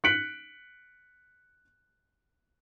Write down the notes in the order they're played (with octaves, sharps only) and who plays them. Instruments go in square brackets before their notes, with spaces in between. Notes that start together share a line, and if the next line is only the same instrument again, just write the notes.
[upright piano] F#6 B6 C#7 D7 F#7